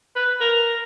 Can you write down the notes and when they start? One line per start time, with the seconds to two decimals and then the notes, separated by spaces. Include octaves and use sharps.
0.16 B4
0.40 A#4